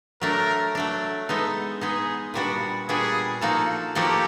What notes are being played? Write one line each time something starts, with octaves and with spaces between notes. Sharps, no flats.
F#3 A3 D4 A#4
F#3 A3 D4
G#3 B3 D#4 A4
G#3 B3 D#4 G#4
A#2 G3 B3 D4 F#4
A#2 G3 B3 D4 F#4 G#4
F3 A#3 D#4 F#4 A4
F3 A#3 D#4 F#4 G4 A4